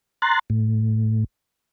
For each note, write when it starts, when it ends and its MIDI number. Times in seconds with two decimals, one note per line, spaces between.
0.22 0.39 82
0.22 0.39 84
0.22 0.39 90
0.22 0.39 93
0.50 1.24 45